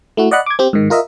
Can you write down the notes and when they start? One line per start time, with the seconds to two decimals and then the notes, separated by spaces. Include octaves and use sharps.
0.17 A3 E4 F#4
0.31 D5 D#5 F#5 B5 F#6
0.46 D6 G#6
0.59 C4 G4
0.73 G#2 D#3
0.90 F4 A#4 D#5 E5